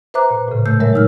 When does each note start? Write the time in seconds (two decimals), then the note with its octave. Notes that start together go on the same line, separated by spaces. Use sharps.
0.14 B4 C5 E5 A#5 D6 F#6
0.30 A#2
0.48 A2 C#3
0.66 A#2 A3 E6 G6
0.80 F#3 G#3 A#4 C#5 E5
0.93 G#3 D#4 E6 F6